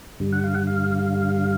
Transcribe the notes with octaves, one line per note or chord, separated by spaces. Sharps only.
G2 D3 G3
F#5
F5
F#5
F5